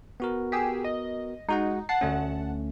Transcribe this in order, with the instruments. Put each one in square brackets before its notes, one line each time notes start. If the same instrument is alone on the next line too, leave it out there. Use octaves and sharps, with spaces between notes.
[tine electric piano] B3 F#4 A#4
[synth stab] G4 G#4 E6
D#5
[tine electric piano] G#3 F#4 F#5 [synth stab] D#4
[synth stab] F#5 A5 [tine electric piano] C7
[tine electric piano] D2 A3 C#4